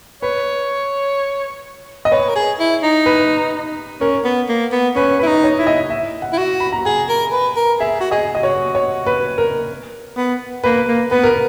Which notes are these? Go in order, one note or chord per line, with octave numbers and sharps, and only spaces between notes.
B4 C#5
D#5
B4 C#5
A#4
G#4
E4
D#4
B4
C#4 A#4
B3
A#3
B3
C#4 B4
E4 B4
D#4
C#5
E4
D#5
E5
F#5
E4
F#4
B5
A#5
G#4 G#5
A#4
B4
A#4
G#4 E5
F#4
G#4 D#5
D#5
F#4 C#5
C#5
B4
A#4
B3
A#3 B4
A#3
B3 B4
A#4